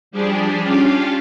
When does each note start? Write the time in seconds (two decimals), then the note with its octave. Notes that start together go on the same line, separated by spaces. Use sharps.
0.11 F3 G3 D4 G4 G#4
0.62 C#4 D4 F4 G4 F5